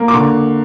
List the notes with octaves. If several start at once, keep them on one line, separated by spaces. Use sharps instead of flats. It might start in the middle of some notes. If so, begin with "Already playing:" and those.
Already playing: A#3
D6
D3 C#6